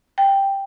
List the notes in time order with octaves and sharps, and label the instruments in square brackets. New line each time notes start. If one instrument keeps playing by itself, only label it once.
[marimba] G5